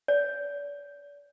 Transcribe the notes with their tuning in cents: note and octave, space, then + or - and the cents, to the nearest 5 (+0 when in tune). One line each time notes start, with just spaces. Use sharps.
D5 -35